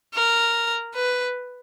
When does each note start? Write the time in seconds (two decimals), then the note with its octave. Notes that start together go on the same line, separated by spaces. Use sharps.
0.15 A#4
0.95 B4